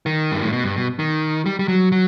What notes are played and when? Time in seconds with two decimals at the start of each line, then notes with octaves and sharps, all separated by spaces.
0.06 D#3
0.32 G2
0.42 A2
0.53 B2
0.64 G2
0.76 B2
0.99 D#3
1.46 G3
1.59 G3
1.68 F#3
1.92 F#3